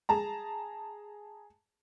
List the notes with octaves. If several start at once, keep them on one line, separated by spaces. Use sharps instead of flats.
G#4 A5 A#5